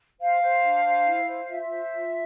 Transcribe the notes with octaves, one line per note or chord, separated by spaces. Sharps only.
C5 F5
C5
D4
C5
E4
C5
F4 E5
C5
F4